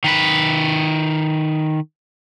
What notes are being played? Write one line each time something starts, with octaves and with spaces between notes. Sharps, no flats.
D#3 B4